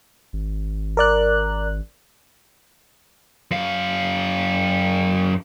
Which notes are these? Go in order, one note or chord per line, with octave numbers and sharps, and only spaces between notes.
G#1
A#4 D5 F#6
F#2 F5